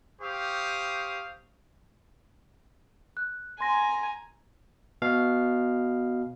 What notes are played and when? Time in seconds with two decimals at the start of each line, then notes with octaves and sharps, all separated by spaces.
0.22 G4 C5 F5 C#6 D#6
3.17 F#6
3.61 G#5 A#5 C6 A#6
5.02 B2 F5